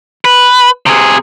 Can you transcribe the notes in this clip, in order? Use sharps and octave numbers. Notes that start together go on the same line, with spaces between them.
B4
C3 G#4